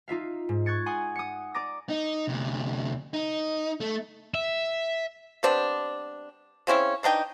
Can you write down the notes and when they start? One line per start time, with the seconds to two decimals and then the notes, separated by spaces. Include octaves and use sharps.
0.08 D#4 F4 E5 F5
0.49 G#2
0.66 C#6 F#6 G#6 A6 C#7
0.86 F#5 G#5 C6 D#6
1.16 D#6 C#7
1.54 D5 A#5 D6 D#6 A#6
1.89 D#4
2.28 D2 C3
3.14 D#4
3.80 A3
4.35 E5
5.43 G3 B3 C4 D4
6.67 C#3 C4 C#4 E4
7.03 E3 D4 D#4 G5